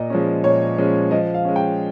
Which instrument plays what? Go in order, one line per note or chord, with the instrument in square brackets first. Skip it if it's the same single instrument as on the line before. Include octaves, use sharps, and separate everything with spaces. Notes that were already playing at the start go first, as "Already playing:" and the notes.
Already playing: [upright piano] A#2 D#5
F3 G#3 C#4
A#2 C#5
F3 G#3 C#4
F3 D#5
F5
G#3 C#4
G5